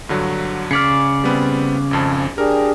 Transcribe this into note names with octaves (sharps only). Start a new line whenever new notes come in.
G2 D3 F#3
C#3 D5 F6 B6 C#7
G3 B3 C4
G#1 F2 A5
D4 G4 G#4 A#4